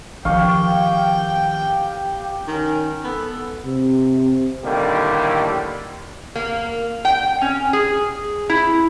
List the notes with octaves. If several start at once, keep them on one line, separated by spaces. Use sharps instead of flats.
D#3 F3 G4 F5 G5 C#6
D#3 C#4
B3 A4
C3
A2 D3 D#3 G3 A#3 G4
A#3
G5
C#4
G#4
E4